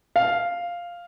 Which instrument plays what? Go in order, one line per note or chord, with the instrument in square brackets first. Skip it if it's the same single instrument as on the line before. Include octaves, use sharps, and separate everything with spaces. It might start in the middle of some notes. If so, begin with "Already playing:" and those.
[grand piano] F5